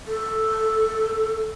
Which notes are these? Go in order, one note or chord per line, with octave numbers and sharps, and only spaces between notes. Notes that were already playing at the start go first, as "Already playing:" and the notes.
A4